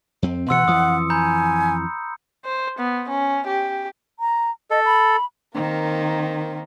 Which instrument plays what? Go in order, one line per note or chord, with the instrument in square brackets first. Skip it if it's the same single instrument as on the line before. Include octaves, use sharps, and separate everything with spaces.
[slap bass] F2 C4
[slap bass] D2 B2 E3 [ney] F#5 [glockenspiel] C6 E6 C#7
[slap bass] F2 E3 [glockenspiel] D#6
[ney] G#5 [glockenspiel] A#5 B5 G6
[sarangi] C5
B3
C#4
G4
[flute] A#5
[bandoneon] A4 [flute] D#5
[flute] B5
[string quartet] D#3 A#3 C4